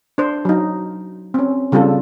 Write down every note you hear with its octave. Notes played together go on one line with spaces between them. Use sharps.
D4 C5
F#3 D#4
C4 C#4
C#3 G3 C4 F4 A4